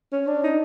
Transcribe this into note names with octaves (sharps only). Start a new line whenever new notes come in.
C#4
D4
D#4